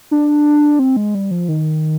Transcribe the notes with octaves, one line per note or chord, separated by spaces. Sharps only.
D4
C4
G#3
G3
F3
D#3